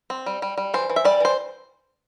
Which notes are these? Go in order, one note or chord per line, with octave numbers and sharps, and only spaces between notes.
C4
G3
G3
G3
E3 C5
E3
E5
G3 D5
E3 C5